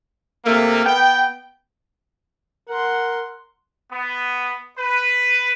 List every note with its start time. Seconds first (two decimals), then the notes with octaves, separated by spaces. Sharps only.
0.45 C3 A3 A#3
0.85 B3 G5
2.69 A#4 F#5 C6
3.91 B3
4.78 B4